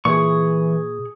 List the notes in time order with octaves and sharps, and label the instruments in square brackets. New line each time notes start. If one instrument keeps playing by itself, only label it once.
[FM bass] A#2 [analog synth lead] E3 [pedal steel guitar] G#4 C#6